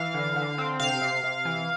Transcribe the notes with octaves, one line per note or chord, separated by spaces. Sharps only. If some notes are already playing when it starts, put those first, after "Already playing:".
Already playing: E3 F5
D3
D3
C4
C3 F5
C3
C3
E3